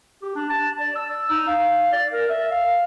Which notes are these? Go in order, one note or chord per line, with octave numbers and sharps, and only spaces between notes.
G4
D4
A5
D5
E6
D#4
F5
D5
A#4
E5
F5